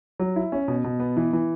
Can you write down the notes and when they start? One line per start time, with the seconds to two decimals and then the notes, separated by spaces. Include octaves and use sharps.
0.20 F#3
0.36 E4
0.52 C#4
0.68 B2
0.84 B2
1.00 B3
1.17 E3
1.33 E3